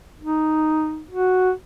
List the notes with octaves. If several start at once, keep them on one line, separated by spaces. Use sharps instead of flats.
D#4
F#4